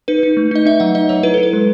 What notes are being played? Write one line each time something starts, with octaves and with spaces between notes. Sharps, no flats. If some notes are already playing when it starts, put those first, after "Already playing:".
D#4 B4
D#4
A3
D#4 D#5
D#4 E5
F#3 F#5
D#4 D#5
F#3 C#5
E4 B4
E4 A4
B4
G#3